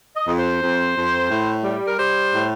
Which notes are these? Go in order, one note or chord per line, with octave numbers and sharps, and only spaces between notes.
D#5
F2
C5
F2
F2
A2
G3
A#4
G3 C5
A2